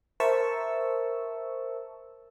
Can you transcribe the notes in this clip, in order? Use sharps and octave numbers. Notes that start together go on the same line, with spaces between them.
A#4 C5 E5 A5 C#6 E6